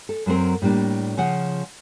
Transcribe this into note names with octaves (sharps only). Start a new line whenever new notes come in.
A4
F#2 F#3 A#3 C4 A#4
A2 G3 A#3 D4
C#3 F3 F4 F#5